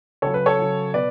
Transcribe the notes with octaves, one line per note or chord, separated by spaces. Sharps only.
C#3 F#3 A4 C#5
B4
A4 C#5
C#3 F#3
B2 B4 D5